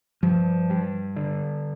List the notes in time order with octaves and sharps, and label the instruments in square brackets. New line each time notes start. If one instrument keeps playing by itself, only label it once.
[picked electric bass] G2 [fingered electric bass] F3
[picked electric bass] G3
D3